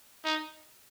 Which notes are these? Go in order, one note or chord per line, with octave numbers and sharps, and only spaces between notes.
D#4